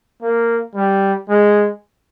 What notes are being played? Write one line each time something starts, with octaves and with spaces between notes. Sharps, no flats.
A#3
G3
G#3